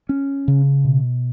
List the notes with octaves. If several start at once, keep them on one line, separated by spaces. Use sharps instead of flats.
C#4
C#3
B2